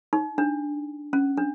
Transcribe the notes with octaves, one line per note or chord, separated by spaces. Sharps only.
D#4
D4
C#4
D4